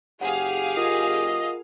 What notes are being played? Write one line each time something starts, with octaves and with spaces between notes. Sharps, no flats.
F#1 G4 G#4 F5 F#5
F4 A#4 D#5 F#5